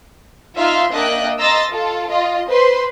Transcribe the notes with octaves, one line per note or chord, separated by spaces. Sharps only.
D#4 F4 E5 C6 F6
A#3 D4 D#5 E5 G5 F#6
D#5 A#5 C6 E6 A6 A#6
F4 A4
F4 D#5
B4 C5 C6